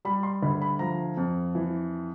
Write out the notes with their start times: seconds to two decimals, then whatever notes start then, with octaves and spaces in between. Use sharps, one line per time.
0.05 G3 B5
0.23 C6
0.43 D2 B5
0.62 B5
0.79 F3 A#5
1.17 F2
1.55 E3